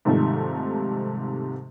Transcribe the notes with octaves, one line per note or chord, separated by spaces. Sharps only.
G#2 C3 D#3 F3 G3 A3